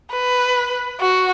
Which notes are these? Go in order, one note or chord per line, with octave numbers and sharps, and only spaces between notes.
B4
F#4